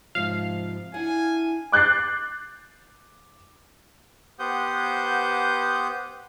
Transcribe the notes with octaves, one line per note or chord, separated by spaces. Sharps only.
G#2 C3 F3 F5
D4 E4 F#5 G#5
D6 F#6 G6 A6 C7
B3 G4 C5 F#5 D#6 G6